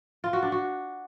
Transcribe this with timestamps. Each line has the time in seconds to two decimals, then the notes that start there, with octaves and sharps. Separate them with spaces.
0.24 F4
0.33 F#4
0.43 D4
0.52 F#4